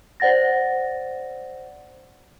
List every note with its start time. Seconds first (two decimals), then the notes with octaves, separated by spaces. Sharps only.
0.20 C5 D5 F#5 A6 A#6